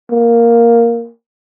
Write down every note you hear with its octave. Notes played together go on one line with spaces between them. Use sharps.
A#3